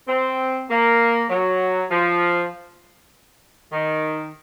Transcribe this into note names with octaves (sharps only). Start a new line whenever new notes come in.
C4
A#3
F#3
F3
D#3